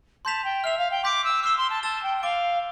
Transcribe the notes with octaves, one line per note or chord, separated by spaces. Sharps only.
A5 C6 G6 B6 F7
G5
E5 F6 C7 F7
F5
G5
C6 D6 G6 B6 D7
E6
D6 E6 F6 C7 E7 G7
C6
A5
A5 E6 A6 E7 G7
G5
G5
F5 D6 A6 D7 G7